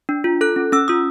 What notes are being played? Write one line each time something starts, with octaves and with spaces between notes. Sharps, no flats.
D4
F4
A4 F#6
C#4
C#4 E6
F4 D#6